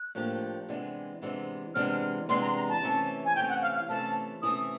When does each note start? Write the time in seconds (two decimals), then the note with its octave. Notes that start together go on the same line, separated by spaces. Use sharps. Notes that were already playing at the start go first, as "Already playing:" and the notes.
Already playing: F#6
0.15 A2 F3 A#3 D4 G4
0.69 C3 E3 G#3 B3 D4
1.22 C3 E3 G#3 B3 D4
1.75 C3 E3 G#3 B3 D4 F6
2.29 C3 E3 G#3 B3 D4 C6
2.42 A#5
2.56 A#5
2.69 A5
2.82 C3 E3 A3 C#4 E4
3.25 G#5
3.35 C3 E3 A3 C#4 E4 G5
3.49 F#5
3.62 F5
3.76 F5
3.89 C3 E3 A3 C#4 E4 A5
4.42 C3 E3 A3 C#4 E4 D#6